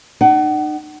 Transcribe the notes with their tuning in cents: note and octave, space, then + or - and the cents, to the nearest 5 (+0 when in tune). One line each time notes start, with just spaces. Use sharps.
D#4 -40 F#5 +30